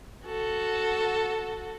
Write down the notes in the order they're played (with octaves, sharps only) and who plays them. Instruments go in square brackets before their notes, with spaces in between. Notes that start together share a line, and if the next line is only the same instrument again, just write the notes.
[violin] F#4 A4